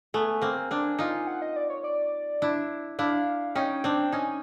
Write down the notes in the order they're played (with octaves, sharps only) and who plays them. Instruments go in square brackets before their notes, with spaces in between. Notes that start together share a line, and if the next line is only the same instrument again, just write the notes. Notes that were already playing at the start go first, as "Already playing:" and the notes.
[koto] A3 B3 [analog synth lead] G#5
[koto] A#3 C4
C4 D4
D#4 F4
[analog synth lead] F#5
D#5
D5
C#5
D5
[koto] D4 E4
[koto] D4 E4 [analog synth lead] F5
[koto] C#4 D#4 [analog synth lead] G5
[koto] C4 D4
[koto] C#4 D#4 [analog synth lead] G#5